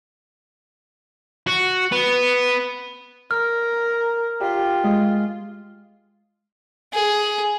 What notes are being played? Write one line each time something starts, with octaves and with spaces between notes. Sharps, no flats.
F#4
B3
A#4 F6
F4 G4
G#3
G#4